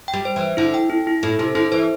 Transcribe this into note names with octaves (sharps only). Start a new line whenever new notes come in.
G5
G3
C5
E3 C5
D3 E4
G5
E4
E4
A2 E4
C3 E4
D3 E4
E3 C5